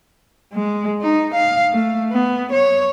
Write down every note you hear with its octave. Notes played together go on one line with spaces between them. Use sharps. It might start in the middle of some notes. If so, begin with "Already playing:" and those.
G#3
D#4
F5
A3
B3
C#5